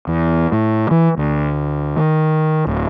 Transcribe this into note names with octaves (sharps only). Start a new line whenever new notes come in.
E2
A2
E3
D2
D#3
D1